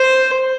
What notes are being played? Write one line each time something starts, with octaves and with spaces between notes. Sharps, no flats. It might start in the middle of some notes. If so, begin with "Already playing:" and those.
Already playing: C5